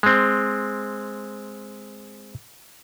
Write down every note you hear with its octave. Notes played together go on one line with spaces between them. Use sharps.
G#3 C4